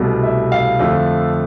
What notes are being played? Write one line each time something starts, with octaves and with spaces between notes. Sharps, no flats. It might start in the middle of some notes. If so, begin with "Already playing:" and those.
Already playing: C2 B2 A3
E5
F5
F2 D3 A3